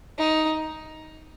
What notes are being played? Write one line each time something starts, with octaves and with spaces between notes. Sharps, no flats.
D#4